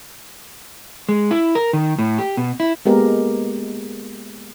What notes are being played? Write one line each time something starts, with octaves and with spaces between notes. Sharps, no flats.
G#3
E4
A#4
D#3
A2
G4
B2
E4
G#3 A#3 B3 G4 A#4